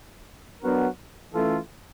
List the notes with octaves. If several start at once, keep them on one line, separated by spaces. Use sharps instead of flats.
F#3 B3 D4 F#4 A#4
E3 A3 C#4 F4 A4